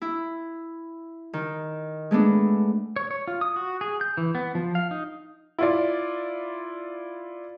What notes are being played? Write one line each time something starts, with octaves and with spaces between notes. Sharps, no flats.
E4
D#3
G#3 A3 B3 D4
C#5
C#5
F4
D#6
F#4
G#4
G6
E3
B3
F3
F5
D#4
E4 F4 D5